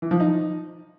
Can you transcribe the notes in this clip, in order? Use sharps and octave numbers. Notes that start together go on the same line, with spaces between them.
E3
F3
D#4